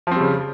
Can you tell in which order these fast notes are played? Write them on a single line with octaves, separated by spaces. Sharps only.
F3 C4 G3 C#3